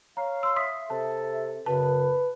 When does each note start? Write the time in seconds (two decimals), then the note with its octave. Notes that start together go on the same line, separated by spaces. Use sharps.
0.17 C#5 F5 A#5
0.43 C6 E6
0.56 E5 C6 D#6 B6
0.90 C3 A4 A5
1.66 F#2 C#3 B4 A5